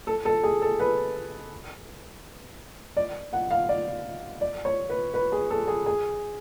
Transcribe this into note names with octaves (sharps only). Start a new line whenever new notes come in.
A4
A4
G#4
A4
B4
D5
F#5
F5
D5
D5
C#5
B4
B4
G#4
A4
G#4
G#4